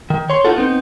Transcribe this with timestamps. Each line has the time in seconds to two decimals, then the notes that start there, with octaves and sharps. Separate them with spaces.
0.10 D#3
0.30 C#5 C6
0.45 D#4 F4 F#4 A4
0.56 B3 C4 D#4